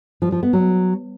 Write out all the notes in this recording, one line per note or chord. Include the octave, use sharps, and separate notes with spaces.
F3
F3
B3
F#3